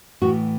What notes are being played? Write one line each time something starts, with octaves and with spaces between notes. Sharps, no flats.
A2 E3 F#4